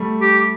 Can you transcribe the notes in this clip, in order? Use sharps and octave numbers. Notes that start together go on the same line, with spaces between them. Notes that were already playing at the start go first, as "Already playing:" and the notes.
Already playing: G3 A3
G4